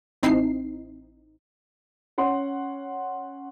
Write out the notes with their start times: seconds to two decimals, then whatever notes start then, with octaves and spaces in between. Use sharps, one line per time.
0.23 A1 C4 D#4 E4 C7
2.18 C#4 F#5 C6